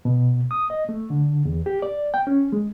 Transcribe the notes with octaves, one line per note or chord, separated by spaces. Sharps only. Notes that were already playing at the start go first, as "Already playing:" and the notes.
B2
D#6
D#5
A3
D3
E2
G4
D5
G5
C#4
G#3